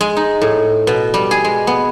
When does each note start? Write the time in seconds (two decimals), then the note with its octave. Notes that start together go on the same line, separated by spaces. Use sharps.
0.01 G#3
0.17 D#4
0.41 A2
0.87 B2
1.14 G3
1.31 G#4
1.45 G#3
1.67 B3